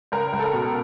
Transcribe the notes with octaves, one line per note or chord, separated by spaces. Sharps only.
C#2 A#4
C#2
A4
A#4
B2